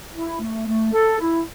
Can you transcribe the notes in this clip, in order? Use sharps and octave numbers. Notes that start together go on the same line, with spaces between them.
E4
A3
A3
A4
E4